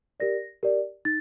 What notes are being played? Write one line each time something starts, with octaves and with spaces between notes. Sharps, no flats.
G4 A#4 D5 A#6
G4 A#4 D5
D#4 A6